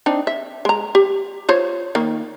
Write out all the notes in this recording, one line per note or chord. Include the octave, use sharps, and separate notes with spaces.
C4 D4 D#4
E5
G#3 A#5
G4
F4 C5 C#5
D#3 A#3